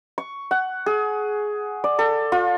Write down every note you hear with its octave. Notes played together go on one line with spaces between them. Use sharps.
C#6
F#5
G#4
D5
A4
F4